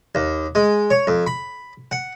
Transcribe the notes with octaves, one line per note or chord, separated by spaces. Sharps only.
D#2
G#3
C#5
F2
B5
F#5